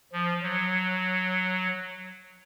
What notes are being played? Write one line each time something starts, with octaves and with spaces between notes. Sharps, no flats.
F3
F#3